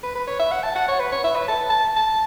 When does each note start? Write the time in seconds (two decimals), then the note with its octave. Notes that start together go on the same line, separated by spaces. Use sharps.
0.03 B4
0.15 B4
0.27 C#5
0.40 E5
0.52 F#5
0.63 A5
0.75 F#5
0.88 C#5
1.00 B4
1.12 C#5
1.24 E5
1.35 B4
1.48 A5
1.70 A5
1.96 A5